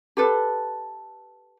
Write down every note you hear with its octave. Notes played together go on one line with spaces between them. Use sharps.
G4 A4 B4